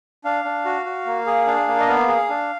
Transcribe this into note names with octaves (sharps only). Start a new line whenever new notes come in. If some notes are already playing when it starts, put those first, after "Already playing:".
D4 F5
D4
F#4
F#4
A#3
G#4
D4 F5
A#3
D#5
B3 F5
G#4
D4